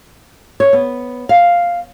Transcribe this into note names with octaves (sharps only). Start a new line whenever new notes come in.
C#5
B3
F5